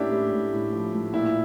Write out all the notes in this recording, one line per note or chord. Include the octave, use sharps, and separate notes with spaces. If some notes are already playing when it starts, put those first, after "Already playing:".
Already playing: A2 A#3 C#4 D4 E4 G4
A2
A2
A2
F3
A2
A#2 E4